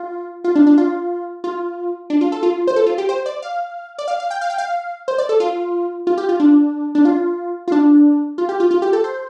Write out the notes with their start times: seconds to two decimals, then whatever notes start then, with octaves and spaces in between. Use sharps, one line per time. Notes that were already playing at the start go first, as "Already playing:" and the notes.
Already playing: F4
0.44 F4
0.55 D4
0.67 D4
0.78 F4
1.44 F4
2.10 D4
2.21 F4
2.32 A4
2.43 F4
2.67 C5
2.76 A4
2.87 F4
2.98 G4
3.09 C5
3.26 D5
3.42 F5
3.98 D5
4.08 F5
4.20 F5
4.30 G5
4.41 F5
4.50 G5
4.58 F5
5.08 C5
5.18 D5
5.29 A4
5.40 F4
6.07 F4
6.18 G4
6.29 F4
6.40 D4
6.95 D4
7.05 F4
7.68 F4
7.72 D4
8.38 F4
8.49 G4
8.60 F4
8.71 F4
8.82 G4
8.93 A4
9.04 C5